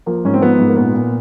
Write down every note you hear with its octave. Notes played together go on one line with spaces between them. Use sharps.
F3 A#3
G#2 C#4
C4
F3 B3
G#2
A#3
A#2 B3
A#2